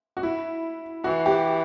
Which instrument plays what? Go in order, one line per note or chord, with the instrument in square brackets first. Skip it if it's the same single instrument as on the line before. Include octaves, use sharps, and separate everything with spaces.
[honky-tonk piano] F#4
E4
[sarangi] E3 [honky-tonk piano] F#4
[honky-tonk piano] G4